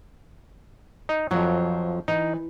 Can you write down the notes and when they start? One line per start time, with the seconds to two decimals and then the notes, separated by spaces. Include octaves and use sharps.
1.09 D#4
1.31 F2 F3 F#3
2.08 E3 D#4